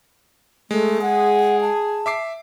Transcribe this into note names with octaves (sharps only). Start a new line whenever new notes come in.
G#3 A3
G#4 F#5
A5
E5 D6 C7